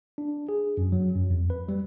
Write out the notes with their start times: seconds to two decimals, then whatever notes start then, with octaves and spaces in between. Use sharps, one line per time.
0.18 D4
0.49 G#4
0.77 F#2
0.92 F#3
1.16 F#2
1.31 F2
1.50 B4
1.69 G3